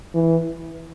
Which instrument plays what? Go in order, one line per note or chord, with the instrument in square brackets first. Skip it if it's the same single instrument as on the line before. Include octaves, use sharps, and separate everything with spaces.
[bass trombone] E3